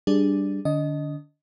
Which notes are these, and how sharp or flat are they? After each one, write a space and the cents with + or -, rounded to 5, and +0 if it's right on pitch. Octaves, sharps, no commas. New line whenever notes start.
G3 +0 D4 +0 G#4 +0
D3 +30 D4 -40 D#5 +0